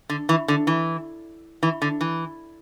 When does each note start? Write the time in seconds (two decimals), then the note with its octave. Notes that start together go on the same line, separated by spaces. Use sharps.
0.09 D3
0.29 E3
0.48 D3
0.67 E3
1.63 E3
1.82 D3
2.01 E3